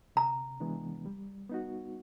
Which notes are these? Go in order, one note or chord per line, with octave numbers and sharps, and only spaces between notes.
C3 A#5
E3 G#3 B3 D4
G3
B3 D#4 F#4